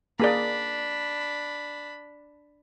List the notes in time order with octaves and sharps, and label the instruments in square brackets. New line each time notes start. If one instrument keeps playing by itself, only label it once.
[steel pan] A#3 G#4 D5 [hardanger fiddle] D4 B5